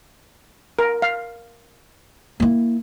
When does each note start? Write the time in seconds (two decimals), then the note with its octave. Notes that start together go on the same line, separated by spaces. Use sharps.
0.79 A#4
1.02 F5
2.40 A#3 E4